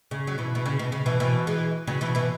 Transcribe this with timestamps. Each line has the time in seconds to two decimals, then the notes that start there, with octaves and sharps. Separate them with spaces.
0.11 C#3
0.27 F#3
0.38 B2 E3
0.55 B2
0.66 C#3
0.79 B2
0.92 C#3
1.06 B2 E3
1.20 B2 E3
1.47 E3 G#3
1.87 C#3 F#3
2.01 B2 E3
2.15 B2 E3